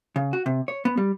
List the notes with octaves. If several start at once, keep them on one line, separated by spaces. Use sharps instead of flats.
C#3
F#4
C3
C#5
B3
G3